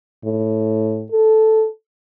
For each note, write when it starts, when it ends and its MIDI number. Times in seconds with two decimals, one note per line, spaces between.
0.25 1.05 45
1.12 1.66 69